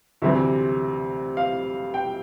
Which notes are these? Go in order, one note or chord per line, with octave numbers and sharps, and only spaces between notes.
D2 C3 E3 E5
F5
G5